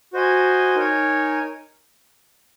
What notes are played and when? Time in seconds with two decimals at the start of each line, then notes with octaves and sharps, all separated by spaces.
0.13 F#4 C5 D#5 G#5
0.76 D#4 A#4 C#5 G#5